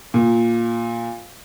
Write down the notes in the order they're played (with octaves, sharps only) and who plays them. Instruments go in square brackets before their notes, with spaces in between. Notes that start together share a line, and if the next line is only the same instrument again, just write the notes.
[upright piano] A#2